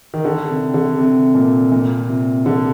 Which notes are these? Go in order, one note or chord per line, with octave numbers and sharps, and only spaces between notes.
D#3
D3
C3
D3
C3
A#2
A#2
C3
D3